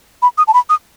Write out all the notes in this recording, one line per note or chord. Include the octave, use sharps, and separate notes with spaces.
B5
D#6
A5
B5
D#6